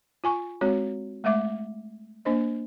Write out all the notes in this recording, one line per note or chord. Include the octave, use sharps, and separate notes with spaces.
F4 G#5 C#6
G#3 C4 F#4 C#5
G#3 A3 E5 D6
A#3 D4 C5 D#5